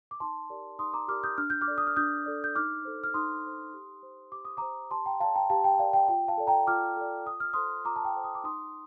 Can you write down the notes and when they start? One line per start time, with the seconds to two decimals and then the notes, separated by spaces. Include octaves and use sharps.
0.11 D6
0.20 D#4 A5 C6
0.50 G4 A#4 D5
0.79 D#4 C6 D#6
0.94 A#5 D6
1.08 G4 A#4 D5 D6 F6
1.24 D#6 G6
1.38 D4 F6
1.50 G6
1.61 D6 F6
1.68 A4 D5
1.78 D#6
1.87 F6
1.96 D4 D#6 G6
2.26 A4 D5
2.44 G6
2.55 D#4 D6 F6
2.85 A4 C5
3.04 F6
3.14 D#4 C6 D#6
3.44 A4 C5
3.73 G4
4.03 C5
4.32 G4 D6
4.45 D#6
4.57 C5 A#5 D6
4.91 G4 A5 C6
5.06 G5 A#5
5.20 A#4 D5 F5 A5
5.35 G5 A#5
5.50 G4 F5 A5
5.64 G5
5.79 A#4 D5 F5
5.93 G5
6.08 F4 G5
6.28 F5 A5
6.38 A4 D5
6.47 G5 A#5
6.67 F4 D6 F6
6.97 A4 D5
7.26 F4 D#6
7.40 F6
7.54 A4 C5 C6 D#6
7.85 F4 A#5 D6
7.96 A5
8.05 G5 A#5
8.15 A4 C5
8.24 D#6
8.35 D6
8.44 D#4 C6 D#6